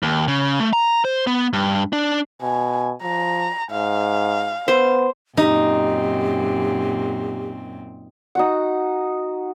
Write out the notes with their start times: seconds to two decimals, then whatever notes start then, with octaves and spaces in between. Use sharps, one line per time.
0.03 D#2
0.28 C#3
0.60 A3
0.73 A#5
1.05 C5
1.27 B3
1.53 G2
1.93 D4
2.42 B2 G#5
3.02 F3 A#5
3.71 G#2 F5
4.68 B3 C5
5.37 F#2 A#2 C4 D#4 G4
8.35 D#4 F#4 F#5